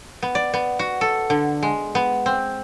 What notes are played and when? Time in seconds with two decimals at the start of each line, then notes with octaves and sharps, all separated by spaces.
0.23 B3
0.35 D5
0.54 B3
0.79 F#4
1.01 A4
1.30 D3
1.63 G#3
1.95 B3
2.26 C4